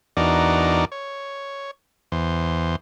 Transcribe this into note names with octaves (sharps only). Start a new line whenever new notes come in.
E2 D4 D#4 F#4 A#4 D5
C#5
E2 C5